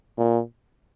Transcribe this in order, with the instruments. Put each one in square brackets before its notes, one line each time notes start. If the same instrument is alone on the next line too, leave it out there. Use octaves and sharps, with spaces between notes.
[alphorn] A#2